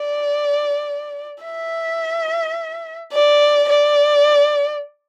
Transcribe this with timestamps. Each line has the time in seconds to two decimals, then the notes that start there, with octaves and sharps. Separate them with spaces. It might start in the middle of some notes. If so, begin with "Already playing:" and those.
Already playing: D5
1.44 E5
3.13 D5
3.69 D5